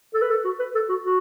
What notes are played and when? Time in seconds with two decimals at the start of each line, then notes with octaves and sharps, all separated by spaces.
0.14 A4
0.22 B4
0.30 A4
0.45 F#4
0.59 B4
0.75 A4
0.89 F#4
1.04 F#4